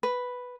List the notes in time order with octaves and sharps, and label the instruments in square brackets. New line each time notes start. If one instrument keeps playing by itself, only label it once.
[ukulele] B4